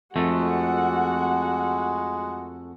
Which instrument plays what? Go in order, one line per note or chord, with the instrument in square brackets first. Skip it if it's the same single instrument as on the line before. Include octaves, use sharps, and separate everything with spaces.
[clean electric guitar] F2 A3 [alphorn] G#3 [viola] F#4 F#5